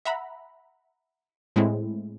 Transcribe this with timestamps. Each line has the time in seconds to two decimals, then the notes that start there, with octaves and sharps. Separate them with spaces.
0.05 E5 F#5 A#5 B5
1.56 A2 G#3 C4 E4